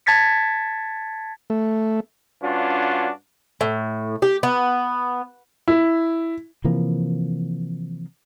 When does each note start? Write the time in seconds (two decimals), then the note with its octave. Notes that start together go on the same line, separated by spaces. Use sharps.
0.06 A5 G#6 A6 B6 C#7
1.50 A3
2.42 G2 C#4 D4 F4 F#4
3.61 A2
4.22 G4
4.43 B3
5.68 E4
6.64 C3 E3 F3 A#3